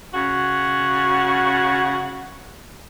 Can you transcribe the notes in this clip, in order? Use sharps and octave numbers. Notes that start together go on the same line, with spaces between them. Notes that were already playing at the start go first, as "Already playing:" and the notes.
C#3 F#4